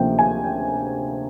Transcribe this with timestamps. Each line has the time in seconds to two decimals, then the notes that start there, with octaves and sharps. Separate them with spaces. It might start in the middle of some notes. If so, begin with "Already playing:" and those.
Already playing: D2 C3 F3 A#3 C#4 G5
0.19 G#5
0.44 G5